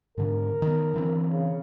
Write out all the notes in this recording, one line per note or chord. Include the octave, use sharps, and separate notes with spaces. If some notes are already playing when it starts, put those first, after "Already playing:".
G#2 D3 A#4
D#3 B3
D3 E3 C4
C#3